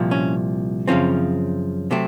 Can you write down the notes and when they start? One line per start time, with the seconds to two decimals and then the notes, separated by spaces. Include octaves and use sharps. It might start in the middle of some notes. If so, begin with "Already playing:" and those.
Already playing: C2 A#2 F3
0.11 C#4
0.88 F#2 C#3 F3 C4 C#4
1.91 C3 F#3 A3 C4